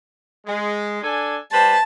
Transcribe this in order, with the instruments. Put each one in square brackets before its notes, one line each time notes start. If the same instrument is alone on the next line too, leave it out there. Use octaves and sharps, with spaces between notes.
[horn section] G#3
D4 A4 G#5
[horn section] G3 B4 C5 [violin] A5